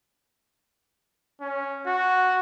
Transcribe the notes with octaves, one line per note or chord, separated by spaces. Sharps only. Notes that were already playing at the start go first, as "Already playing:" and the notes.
C#4
F#4